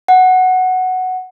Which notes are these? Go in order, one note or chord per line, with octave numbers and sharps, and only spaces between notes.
F#5